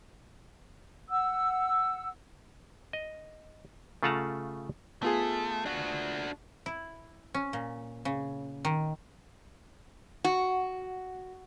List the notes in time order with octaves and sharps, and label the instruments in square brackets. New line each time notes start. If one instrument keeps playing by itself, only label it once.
[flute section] F#5 E6
[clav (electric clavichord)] D#5
C#3 A3 F4 F#5 A5 A#5
[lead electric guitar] A3 [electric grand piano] B3 F4 G#4
[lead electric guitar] D4 F#4
[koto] E4
C#4
A#2
C#3
D#3
[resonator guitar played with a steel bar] F#4